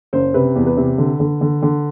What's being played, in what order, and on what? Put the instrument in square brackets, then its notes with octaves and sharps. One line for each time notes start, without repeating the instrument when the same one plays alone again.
[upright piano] F#1 C5
C3 B4
E2
B4
C3
D3
D3
D3
D3